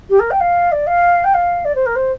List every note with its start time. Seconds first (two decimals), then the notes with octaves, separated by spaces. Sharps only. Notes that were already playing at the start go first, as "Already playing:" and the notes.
0.09 G4
0.19 A#4
0.31 G5
0.40 F5
0.72 D5
0.87 F5
1.24 G5
1.34 F5
1.65 D5
1.75 C5
1.86 A#4
1.95 C5